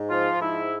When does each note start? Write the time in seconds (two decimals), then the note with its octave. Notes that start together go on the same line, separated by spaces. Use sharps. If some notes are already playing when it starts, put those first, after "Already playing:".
Already playing: G#2
0.10 F3 F4
0.42 G#2 E4